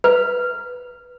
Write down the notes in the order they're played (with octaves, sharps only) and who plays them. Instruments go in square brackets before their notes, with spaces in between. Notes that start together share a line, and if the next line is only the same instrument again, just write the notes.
[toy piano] B4